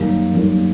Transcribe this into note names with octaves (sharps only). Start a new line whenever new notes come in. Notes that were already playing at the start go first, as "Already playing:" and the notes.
Already playing: F#2 D#3 G3 A#3
F#2 D#3 G3 A#3